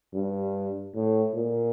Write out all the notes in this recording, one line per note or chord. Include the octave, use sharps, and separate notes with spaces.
G2
A2
A#2